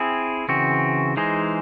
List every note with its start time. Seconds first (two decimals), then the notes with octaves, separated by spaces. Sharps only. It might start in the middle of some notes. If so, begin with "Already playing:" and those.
Already playing: C4 E4 G#4
0.49 C#3 E3 C4 F#4
1.17 E3 G#3 D#4 G#4 C5